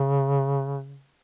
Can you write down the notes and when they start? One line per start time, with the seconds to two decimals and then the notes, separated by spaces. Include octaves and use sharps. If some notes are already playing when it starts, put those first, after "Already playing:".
Already playing: C#3